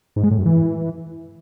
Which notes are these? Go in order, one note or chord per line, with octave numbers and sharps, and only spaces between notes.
G#2
G#3
A2
F#2
E3